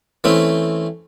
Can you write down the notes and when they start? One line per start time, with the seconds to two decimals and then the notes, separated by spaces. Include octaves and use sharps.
0.24 E3 A3 C4 C#4